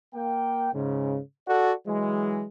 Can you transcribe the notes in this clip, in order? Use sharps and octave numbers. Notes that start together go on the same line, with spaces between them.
A#3 G5
G#2 C#3
F#4 A4 D5 F#5
E3 F#3 G#3